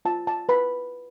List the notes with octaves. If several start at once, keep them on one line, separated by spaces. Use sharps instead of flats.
F4 A5
A5
B4 B5